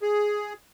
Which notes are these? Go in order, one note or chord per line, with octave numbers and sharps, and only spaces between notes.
G#4